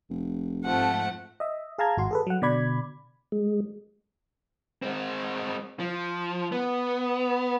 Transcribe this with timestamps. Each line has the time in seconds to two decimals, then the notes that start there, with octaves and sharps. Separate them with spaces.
0.10 F1
0.65 G#2 F3 A3 C4 F#5
1.40 D#5 E5
1.78 G#4 F5 A5 A#5 G#6
1.97 G#1 F#4 C6
2.11 G#4 A4 B4
2.27 F#3 F#5
2.42 B2 D3 D5 B5 G#6
3.32 G#3
4.82 G#3 C4
5.80 F3
6.52 B3